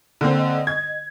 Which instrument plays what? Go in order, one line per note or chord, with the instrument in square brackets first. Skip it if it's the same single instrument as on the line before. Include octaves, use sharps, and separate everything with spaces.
[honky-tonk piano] D3 A#3 C4
[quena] D#5
[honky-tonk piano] G#6